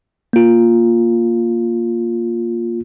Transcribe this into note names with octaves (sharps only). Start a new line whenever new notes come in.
A#3 F4